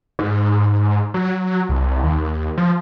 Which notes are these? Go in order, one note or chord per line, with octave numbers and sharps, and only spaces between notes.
G#2
F#3
C2
D#2
F3